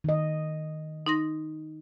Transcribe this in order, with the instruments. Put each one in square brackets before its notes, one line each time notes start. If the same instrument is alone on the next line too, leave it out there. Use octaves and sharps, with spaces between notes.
[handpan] D#3 D#5
[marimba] D#4 C6 A#6